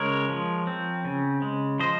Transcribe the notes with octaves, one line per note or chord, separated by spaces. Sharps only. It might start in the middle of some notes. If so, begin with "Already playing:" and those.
Already playing: C#3 G#3 A#4 C#5
F3
C4
C#3
G#3
F3 C5 D#5